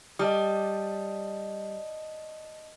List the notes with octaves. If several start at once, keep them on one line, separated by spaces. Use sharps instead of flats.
G3 D#5 A5 D#6